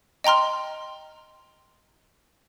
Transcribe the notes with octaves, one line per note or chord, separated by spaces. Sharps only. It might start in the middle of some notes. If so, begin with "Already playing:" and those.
D#5 G5 A#5 C6 F6